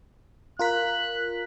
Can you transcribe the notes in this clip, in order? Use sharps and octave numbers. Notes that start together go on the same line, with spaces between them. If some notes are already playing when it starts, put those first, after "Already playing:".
F4 A#4 F#6 B6